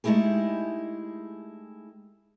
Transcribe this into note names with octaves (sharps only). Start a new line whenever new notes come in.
G#3 A3 D#4 E4 G4 G#4